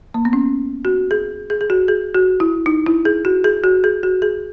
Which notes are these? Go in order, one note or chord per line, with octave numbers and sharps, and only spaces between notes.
A#3
B3
C#4
F#4
G#4
G#4
G#4
F#4
G#4
F#4
E4
D#4
E4
G#4
F#4
G#4
F#4
G#4
F#4
G#4